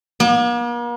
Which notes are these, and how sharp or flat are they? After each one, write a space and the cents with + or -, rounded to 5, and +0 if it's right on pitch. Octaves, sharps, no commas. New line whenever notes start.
A#3 +45